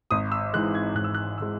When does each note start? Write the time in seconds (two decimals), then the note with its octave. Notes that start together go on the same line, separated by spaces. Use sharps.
0.11 G#1 D#6
0.32 E6
0.53 G#2 E3 G#3 F#6
0.75 G#6
0.95 G#1 F#6
1.04 E6
1.15 F#6
1.38 E3 G#3 E6